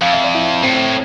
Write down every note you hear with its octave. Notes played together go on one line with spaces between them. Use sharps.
F2 F5
E5
D5
E4 E5
A2 C4 C5